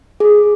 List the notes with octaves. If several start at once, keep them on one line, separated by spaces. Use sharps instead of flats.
G#4